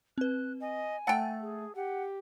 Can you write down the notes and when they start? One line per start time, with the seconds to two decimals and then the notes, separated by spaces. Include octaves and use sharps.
0.18 C4 B4 F#6
0.61 D#5 G#5
1.07 A3 F#5 G5 A5 E6 A6
1.41 G#4
1.76 G4 F#5